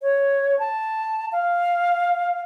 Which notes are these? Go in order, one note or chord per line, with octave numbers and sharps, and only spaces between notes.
C#5
A5
F5